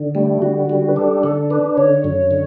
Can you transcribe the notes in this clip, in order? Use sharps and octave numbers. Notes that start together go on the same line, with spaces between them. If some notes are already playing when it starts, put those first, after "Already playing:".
Already playing: D3
G3 A3
D3 F#4
G3
B4
D4 A4
D3 A4
D4 B4
D3 C#5
F#2
D3